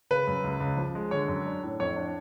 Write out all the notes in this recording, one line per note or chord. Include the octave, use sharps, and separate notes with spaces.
C#3 B4
F#2
C#2
C#2
F3
G#3
D3 C#5
F#2
D4
A2
F2 C#5
D4